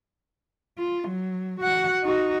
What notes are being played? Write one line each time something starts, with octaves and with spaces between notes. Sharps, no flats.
F4
F#3
F#4 F#5
D#4 F#4